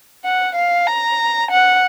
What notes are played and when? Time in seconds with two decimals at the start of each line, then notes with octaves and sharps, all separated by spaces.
0.24 F#5
0.55 F5
0.87 A#5
1.51 F#5